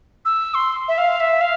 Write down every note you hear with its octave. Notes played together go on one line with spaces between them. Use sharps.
E6
C6
E5
F5
E5
F5